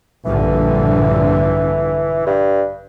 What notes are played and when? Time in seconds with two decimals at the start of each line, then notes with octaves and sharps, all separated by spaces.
0.25 A#1 G2 D3 E3
2.27 G2